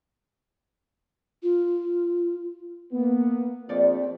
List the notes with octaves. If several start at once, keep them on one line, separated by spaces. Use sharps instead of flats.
F4
A#3 B3
A#1 F2 F3 A3 C4 D5